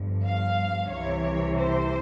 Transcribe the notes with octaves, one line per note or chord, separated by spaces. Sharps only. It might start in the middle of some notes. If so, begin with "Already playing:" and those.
Already playing: G1 G2 F3
F5
C2 C3 E3 C#5
C5